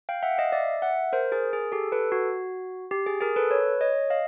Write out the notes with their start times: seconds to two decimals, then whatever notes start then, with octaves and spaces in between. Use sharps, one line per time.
0.09 F5 G5
0.23 E5 F#5
0.38 D#5 F5
0.52 D5 E5
0.82 E5 F#5
1.13 A#4 C5
1.32 G#4 A#4
1.53 G#4
1.72 G4 A4
1.92 A4 B4
2.12 F#4
2.91 G4
3.06 G#4
3.21 G#4 A#4
3.36 A4 B4
3.51 B4 C#5
3.81 C#5 D#5
4.10 D#5 F5